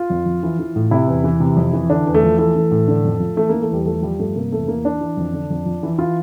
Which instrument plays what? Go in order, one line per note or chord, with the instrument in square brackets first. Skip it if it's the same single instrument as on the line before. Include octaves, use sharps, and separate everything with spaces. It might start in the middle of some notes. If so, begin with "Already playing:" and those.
Already playing: [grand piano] F4
F2
F3
E3
E3
A2
C3 E4
E2
E3
C3
F2
E3
D3 D4
E2
A3
F3
E3 A3
E3
A2
D3
F2
F3
E3 A3
E3 A#3
A3
E2 G3
F3 A3
F3 G3
G2 A3
C3 A#3
E2 A3
E3 A#3
E3 D4
E3
F2
D3
F2
F3
E3
E3 F4